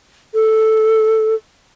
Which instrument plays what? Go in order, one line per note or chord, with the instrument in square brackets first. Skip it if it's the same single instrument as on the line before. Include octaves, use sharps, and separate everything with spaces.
[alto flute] A4